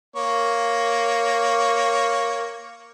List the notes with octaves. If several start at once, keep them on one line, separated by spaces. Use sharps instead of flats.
A#3 C#5